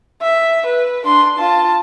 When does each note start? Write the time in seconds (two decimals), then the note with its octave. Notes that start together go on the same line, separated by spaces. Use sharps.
0.22 E5
0.66 B4
1.05 D4 C6
1.38 F4 A5